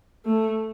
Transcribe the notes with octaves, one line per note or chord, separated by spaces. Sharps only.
A3